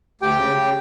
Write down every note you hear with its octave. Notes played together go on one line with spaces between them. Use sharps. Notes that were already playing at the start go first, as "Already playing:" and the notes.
D2 G4 G5
C#3
C#3